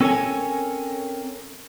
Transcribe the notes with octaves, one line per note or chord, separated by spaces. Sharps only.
C4 C#4 A4 A#4 C#5 G#5